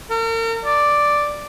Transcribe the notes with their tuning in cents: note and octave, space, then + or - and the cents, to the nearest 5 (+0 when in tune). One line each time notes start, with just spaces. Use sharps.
A#4 -40
D5 +0